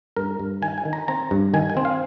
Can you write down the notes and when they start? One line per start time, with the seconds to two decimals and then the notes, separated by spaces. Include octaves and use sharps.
0.17 G2 A#4
0.39 G2
0.62 D#3 G#5
0.78 G#5
0.85 D#3
0.93 A#5
1.08 C4 A#5
1.31 G2
1.54 D#3 G#5
1.70 G#5
1.77 C4
1.85 F5